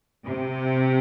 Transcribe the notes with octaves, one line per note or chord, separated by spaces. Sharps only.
C3